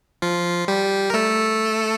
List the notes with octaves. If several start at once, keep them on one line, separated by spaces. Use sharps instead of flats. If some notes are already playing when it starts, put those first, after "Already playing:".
F3 F4
G3 G4
A#4
A3 A4